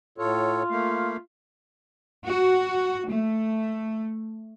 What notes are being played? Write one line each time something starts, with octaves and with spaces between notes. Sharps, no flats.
A2 F4 A4 C#5
A3 A#3 F5
F#4
A3